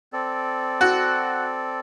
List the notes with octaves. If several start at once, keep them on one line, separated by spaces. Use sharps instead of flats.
C4 A4 D5
F#4